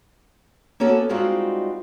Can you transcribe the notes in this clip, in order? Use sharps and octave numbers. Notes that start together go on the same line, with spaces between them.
A#3 B3 C#4 F#4 A4
G3 G#3 C4 D#4 F4 F#4